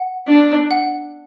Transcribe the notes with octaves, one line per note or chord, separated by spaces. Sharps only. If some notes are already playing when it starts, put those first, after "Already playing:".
Already playing: F#5
D4
F#5